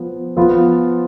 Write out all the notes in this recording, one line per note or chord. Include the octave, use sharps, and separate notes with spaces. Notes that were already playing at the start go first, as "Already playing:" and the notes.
Already playing: F3 B3
F3 B3 F4